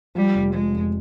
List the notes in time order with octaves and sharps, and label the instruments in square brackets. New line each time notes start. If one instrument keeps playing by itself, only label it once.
[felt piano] F3 [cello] G3
[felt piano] F1
[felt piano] F3 [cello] G#3
[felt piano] F2